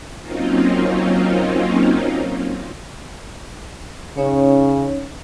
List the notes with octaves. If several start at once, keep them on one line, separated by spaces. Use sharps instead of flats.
F#3 A#3 C4 C#4 D#4 F4
C#3 C#4 D#4 C#5